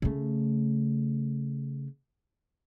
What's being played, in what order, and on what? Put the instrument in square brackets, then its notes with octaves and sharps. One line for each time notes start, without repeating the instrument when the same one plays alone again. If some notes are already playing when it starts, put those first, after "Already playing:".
[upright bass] C#3 A3